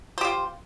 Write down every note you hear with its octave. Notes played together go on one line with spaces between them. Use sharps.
F4 G4 C5